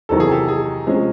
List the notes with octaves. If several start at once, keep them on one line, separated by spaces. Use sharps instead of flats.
E2 C3 D#3 F#3 A4
G#4
G4 A4
G#4
C3 F3 G#3 C#4